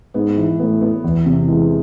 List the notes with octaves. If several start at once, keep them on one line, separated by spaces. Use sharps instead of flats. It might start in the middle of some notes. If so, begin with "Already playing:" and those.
G#2 B3
E3
A2 B3
B3
E2
C3
E3 G#3